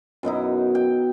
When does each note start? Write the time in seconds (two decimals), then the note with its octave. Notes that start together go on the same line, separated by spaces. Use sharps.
0.23 F#2 B2 D#4 E4
0.75 G5